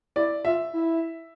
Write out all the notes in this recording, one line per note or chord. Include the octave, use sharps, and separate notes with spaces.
E4 D5
F4 E5
E4